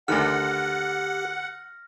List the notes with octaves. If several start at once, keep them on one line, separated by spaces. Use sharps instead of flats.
D2 D3 D#3 G4 F#5 F6 A#6